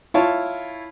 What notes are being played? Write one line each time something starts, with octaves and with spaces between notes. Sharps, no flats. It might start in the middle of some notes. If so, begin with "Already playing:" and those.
E4 F4 C#5 A5